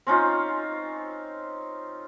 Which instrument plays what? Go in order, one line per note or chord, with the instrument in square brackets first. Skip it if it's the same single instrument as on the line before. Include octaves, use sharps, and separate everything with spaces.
[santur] C4 C#4 D#4 F4